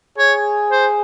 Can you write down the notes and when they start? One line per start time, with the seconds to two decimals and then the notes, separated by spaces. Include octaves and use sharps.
0.17 G#4 C#5
0.71 C5